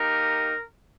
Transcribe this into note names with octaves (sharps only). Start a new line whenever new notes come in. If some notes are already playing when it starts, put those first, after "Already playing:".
Already playing: A#3 D#4 G4 A#4